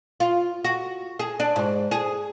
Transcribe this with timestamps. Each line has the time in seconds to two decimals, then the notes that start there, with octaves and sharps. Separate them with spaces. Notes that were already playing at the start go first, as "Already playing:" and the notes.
0.20 F4
0.65 F#4
1.19 G#4
1.40 D4
1.56 G#2
1.91 G#4